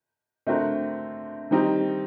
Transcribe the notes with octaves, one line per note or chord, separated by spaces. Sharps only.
D3 A3 C4 F#4 A#4
D#3 G3 C4 D#4